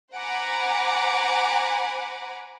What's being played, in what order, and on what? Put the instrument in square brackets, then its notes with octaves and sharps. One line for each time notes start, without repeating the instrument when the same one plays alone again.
[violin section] C5 F#5 G#5 A#5 B5 D6